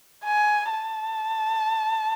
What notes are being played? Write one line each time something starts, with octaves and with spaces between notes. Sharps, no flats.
G#5
A5